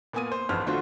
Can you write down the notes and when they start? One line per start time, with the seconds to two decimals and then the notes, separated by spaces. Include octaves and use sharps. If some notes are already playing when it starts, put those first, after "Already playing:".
0.13 A#2 A#3 B3 G#5 D#6 D#7
0.32 C5
0.49 A1 F2 B4 C5 A5 F6
0.66 D3 A3 D4 F4 F#4 C5